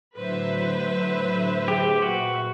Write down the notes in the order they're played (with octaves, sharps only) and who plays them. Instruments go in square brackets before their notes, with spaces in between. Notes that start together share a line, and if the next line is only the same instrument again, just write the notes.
[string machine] A2 D3 F#3 [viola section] B4 C5 E5
[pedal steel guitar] G4 [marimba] G#4
[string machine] A#2 [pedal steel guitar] F#4